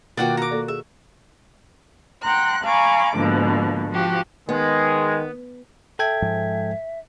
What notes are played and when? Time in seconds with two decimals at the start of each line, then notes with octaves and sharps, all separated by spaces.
0.17 B2 D#3 A#3 F4 F#4 D5 F#5 G5
0.37 F#4 A#5 D6
0.51 A#3 A4 D5
0.68 G#4 E5
2.22 F#5 G5 A#5 C6 F#6
2.64 F5 G#5 A#5 B5 C#6 D6
3.16 G#2 B2 D3 F3 A#3
3.89 F3 F#4 G4
4.49 D#3 G#3 B3
5.99 A4 E5 G5 G#6
6.22 G#2 F3 G#3